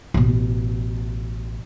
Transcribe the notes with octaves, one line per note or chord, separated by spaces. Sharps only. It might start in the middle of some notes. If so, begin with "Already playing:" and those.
A1 B2